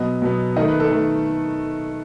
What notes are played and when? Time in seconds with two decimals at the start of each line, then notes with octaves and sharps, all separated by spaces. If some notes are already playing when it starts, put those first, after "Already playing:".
Already playing: B2 F#3 B3 D#5
0.22 B2 F#3 B3
0.56 D#3 A3 D#5
0.68 B4
0.80 A4
0.91 D#3 A3